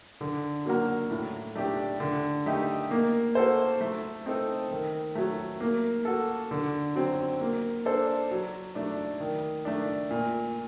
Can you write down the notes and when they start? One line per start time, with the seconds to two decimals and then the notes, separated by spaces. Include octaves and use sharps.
0.21 D3
0.65 F#3 A#3 F#4 A#4
1.10 A2
1.55 A3 D4 G4 D5
2.00 D3
2.46 A3 D#4 G4
2.91 A#3
3.35 F#4 A4 C5
3.81 A3
4.26 C4 D#4 A4
4.71 D#3
5.15 F#3 A3
5.61 A#3
6.05 F#4 A4
6.51 D3
6.95 F#3 C4
7.41 A#3
7.85 D4 A4 C5
8.31 F#3
8.75 A3 D4
9.20 D#3
9.65 A3 D4
10.10 A#2